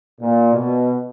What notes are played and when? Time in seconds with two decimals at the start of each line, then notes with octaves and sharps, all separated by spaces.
0.19 A#2
0.52 B2